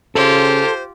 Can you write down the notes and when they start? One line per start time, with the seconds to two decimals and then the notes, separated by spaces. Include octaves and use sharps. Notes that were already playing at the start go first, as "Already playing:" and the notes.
0.15 C#3 F4 G4 A4 C5